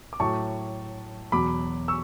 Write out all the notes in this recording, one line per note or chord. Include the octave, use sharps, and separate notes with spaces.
D6
A2 F#3 A5 C#6
E2 B2 F#3 B5 D6
C#6 E6